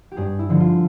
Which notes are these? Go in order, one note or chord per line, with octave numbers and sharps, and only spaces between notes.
G4
G2 G#4
E4
D3 F3
F4